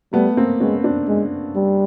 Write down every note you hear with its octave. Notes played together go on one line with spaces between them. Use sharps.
G3 A3 B3
A#3 C4
G#3 B3 C#4
C4 D4
G#3
G3